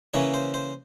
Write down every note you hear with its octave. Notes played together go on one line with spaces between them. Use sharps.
C#3 E3 A#3 C#4 C#5
C5
C5